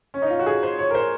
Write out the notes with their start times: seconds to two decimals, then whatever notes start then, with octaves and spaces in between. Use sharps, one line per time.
0.14 C#4
0.22 D#4
0.30 F4
0.39 F#4
0.46 G#4
0.63 C5
0.79 C#5
0.91 A#4
0.95 C5